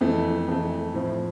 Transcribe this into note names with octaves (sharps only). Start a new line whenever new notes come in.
F2 E3 A3
F2 E3 A3
A2 F3 C4 E4